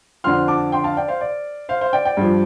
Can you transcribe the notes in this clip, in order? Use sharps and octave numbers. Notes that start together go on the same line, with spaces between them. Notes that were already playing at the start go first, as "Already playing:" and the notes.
F2 D3 F3 C6 F6
A5 D6
G5 C6
F5 A5
D5 G5
C5 F5
D5
C5 F5
C5 F5
D5 G5
D5 G5
G2 F3